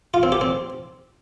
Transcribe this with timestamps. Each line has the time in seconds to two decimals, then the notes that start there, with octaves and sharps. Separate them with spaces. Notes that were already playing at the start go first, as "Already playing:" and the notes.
0.14 F4
0.23 C4
0.32 G4
0.41 C4